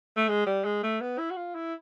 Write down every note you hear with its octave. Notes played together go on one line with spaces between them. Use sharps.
A3
G#3
G3
G#3
A3
B3
E4
F#4
F4
E4